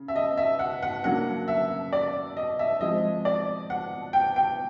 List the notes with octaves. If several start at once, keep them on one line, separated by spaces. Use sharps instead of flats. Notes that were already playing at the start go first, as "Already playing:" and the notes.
Already playing: C#3
E5
D#5
E5
F#5
F#5
C#3 F#3 A#3 D4 F#5
E5
D5
D#5
E5
F3 G#3 C4 D#5
D5
F#5
G5
G5